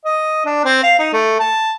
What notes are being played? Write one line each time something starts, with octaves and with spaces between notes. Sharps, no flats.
D#5
D4
C4
F5
D#4
A3
A5